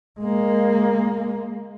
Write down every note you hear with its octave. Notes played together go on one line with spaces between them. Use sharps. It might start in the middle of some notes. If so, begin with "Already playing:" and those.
G#3 A#3